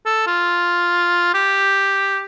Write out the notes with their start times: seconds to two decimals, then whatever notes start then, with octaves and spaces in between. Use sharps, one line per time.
0.05 A4
0.27 F4
1.34 G4